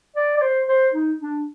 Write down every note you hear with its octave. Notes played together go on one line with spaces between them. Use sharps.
D5
D5
C5
C5
D#4
D4